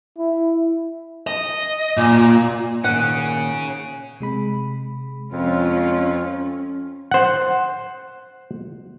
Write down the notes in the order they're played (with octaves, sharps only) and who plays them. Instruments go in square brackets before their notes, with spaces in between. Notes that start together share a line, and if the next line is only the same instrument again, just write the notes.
[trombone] E4
[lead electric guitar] D#5
A#2
[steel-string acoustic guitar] A#2 D#3 [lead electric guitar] C#4 G#4 [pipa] F#5
[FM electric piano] C3 G#3 B5
[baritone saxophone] F2 [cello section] C#4 [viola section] F4
[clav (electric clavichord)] C5 F#5